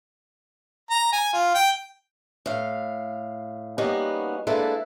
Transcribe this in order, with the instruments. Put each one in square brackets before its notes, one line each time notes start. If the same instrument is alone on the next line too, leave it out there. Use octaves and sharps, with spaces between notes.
[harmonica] A#5
G#5
F4
G5
[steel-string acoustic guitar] A2 F5
G3 A#3 B3 C#4 D#4 F#4
G#3 A#3 D4 E4 A4 B4